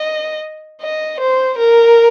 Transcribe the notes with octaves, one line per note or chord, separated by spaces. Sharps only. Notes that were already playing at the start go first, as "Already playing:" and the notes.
Already playing: D#5
D#5
C5
A#4